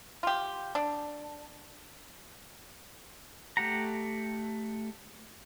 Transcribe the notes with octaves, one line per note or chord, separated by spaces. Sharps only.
F4 G4
D4
A3 G4 F#5 A#5